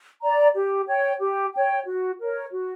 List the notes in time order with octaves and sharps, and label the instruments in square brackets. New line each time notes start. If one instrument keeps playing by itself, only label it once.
[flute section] D5 A#5
G4
C#5 G5
G4
C#5 G5
F#4
A#4 C#5
F#4